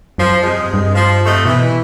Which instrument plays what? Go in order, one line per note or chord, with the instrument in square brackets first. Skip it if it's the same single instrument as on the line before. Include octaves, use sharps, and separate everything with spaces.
[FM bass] F#2 [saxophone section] F3
[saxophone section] C3 G#3
[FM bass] G2
[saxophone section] F3
C3 A3 D#5
[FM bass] B2 [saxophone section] E3